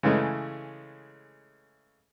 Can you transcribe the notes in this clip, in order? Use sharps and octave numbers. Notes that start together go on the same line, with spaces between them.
C#3 E3 G#3 A3